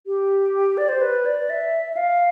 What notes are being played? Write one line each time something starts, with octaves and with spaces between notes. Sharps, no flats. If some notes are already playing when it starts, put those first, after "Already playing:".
G4
D5
C5
B4
D5
E5
E5
F5